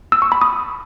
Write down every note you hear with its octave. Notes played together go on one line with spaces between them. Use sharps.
E6
C#6
B5
D#6